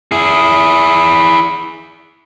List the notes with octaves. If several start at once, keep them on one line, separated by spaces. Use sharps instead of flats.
E4 G#4